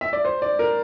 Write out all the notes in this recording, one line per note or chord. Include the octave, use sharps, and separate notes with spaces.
E5
D5
C5
D5
A#4